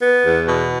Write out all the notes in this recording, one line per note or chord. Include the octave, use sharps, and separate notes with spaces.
B3
E2
B2